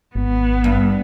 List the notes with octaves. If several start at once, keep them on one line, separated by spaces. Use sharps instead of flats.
G#1 B3
G2